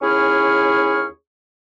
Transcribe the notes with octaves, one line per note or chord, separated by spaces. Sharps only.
D#2 C#4 E4 G#4 C#6 F6